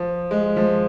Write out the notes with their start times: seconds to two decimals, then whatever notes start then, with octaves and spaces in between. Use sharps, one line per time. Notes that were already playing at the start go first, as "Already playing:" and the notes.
Already playing: F3
0.31 G#3
0.56 F3